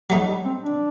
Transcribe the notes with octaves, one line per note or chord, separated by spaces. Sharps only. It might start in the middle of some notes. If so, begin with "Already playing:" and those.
F#3 G3 A3 D#4
G3
C4
D4